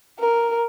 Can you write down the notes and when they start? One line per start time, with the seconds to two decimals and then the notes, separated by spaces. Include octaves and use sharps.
0.19 A#4